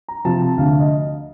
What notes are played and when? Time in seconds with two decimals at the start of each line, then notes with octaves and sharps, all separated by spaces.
0.08 A#5
0.25 C3 F3 A5
0.42 A5
0.57 D2 F5
0.79 D#5